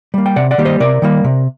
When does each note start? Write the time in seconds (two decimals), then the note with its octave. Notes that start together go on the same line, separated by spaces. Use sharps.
0.14 G3 A#3
0.26 G5
0.36 C3 D5 F#5
0.51 D5 F#5
0.58 D#3 G3 A#3
0.65 C5 D#5
0.80 C3 A#4 D5
1.02 D#3 G3 A#3
1.24 C3